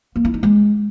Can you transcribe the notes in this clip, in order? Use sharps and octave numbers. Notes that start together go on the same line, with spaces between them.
A#3
E4
D#4
G#3